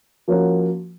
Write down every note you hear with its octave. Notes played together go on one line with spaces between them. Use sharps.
F3 A#3 C#4 F#4